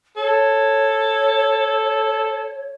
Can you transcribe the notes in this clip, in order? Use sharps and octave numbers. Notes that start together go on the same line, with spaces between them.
A4 C#5